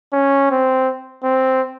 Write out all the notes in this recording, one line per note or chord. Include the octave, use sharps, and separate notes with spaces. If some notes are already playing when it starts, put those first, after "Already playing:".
C#4
C4
C4